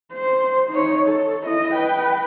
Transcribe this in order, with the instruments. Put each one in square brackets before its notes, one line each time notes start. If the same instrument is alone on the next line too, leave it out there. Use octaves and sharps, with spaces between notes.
[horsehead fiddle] C5
D#4 C#5
A4
E4 D#5
B4 G5